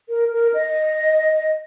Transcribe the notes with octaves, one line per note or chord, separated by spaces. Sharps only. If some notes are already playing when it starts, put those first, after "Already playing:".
A#4
A#4
D#5